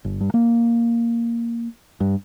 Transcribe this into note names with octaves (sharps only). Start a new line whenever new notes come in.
G1
G2
A#3
G2